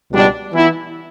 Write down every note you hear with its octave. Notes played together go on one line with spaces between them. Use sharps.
C#2 B2 G3 D4
E3 B3 E4